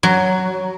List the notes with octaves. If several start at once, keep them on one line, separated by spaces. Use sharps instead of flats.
F#3